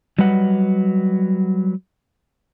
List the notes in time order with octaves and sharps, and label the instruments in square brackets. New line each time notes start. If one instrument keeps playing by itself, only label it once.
[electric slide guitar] F#3 G3 B4 D#5 F#5